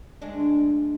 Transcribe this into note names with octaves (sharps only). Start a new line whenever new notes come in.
D2 G#3 D4